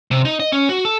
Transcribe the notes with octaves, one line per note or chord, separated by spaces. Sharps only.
C3
D#4
D#5
C#4
F#4
A4